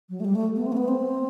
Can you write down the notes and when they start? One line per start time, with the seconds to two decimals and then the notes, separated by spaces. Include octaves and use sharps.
0.10 F#3
0.20 A3
0.25 G3
0.35 A3
0.56 B3
0.66 C4
0.72 A3
0.77 B3
0.88 C4